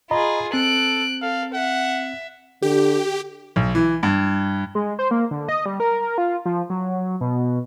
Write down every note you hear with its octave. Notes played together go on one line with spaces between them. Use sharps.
F4 G#4 D#5 A#5 B5
C4 A4 F#6 D7
A4 F5
E5 F#5
D3 G4
B1
E3
G2
G#3
C5
A#3
D3
D#5
G3
A#4
F4
F3
F#3
B2